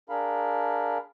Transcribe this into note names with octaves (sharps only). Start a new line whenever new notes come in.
D4 G#4 A#4 F5 B5